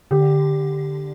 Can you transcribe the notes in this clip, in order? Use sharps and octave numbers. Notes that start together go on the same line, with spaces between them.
D3 G4